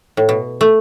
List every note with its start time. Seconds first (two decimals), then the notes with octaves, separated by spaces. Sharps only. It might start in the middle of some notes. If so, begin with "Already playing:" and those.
0.17 A2
0.29 B2
0.61 A3